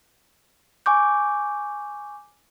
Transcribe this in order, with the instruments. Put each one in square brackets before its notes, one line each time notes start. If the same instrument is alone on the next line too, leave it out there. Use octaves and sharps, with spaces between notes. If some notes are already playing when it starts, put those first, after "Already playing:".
[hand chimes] G#5 C#6 D6 G6